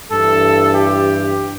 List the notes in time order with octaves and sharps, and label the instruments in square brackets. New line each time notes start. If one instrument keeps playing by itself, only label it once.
[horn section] G2 E3 A4
G4